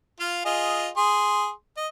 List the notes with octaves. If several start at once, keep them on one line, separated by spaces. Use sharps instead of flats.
F4 F5
F4 G#4 D#5
G#4 C6
D#5